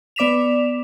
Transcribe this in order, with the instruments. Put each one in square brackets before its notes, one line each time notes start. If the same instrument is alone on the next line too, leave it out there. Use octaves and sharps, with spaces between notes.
[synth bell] B3 D5 D6 B6 E7 F7